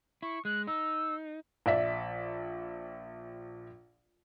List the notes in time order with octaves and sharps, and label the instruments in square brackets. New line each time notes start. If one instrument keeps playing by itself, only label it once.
[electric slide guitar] E4 [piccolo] C#6
[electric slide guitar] G#3 [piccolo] F#6
[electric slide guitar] D#4 [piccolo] E6
[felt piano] A#1 D5 E5 B6